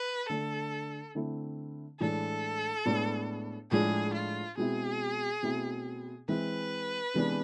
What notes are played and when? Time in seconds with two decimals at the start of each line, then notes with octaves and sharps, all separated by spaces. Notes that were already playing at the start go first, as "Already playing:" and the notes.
Already playing: B4
0.29 D3 A3 D4 A4
1.15 D3 A3 C4 E4
2.00 A2 E3 G#3 D4 A4
2.86 A2 G#3 B3 D4
3.71 A2 F3 G#3 D4 G#4
4.14 F4
4.57 B2 G#3 C4 E4 G#4
5.43 B2 A3 C4 E4
6.28 E3 G#3 C4 E4 B4
7.14 C3 E3 G#3 B3 D4